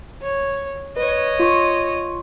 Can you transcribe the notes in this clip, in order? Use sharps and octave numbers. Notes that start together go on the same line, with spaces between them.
C#5
B4 C#5 D#5
F4 C#6